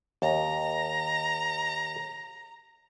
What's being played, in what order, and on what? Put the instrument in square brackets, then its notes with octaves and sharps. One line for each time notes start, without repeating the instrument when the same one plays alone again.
[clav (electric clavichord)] D#2 [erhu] A#5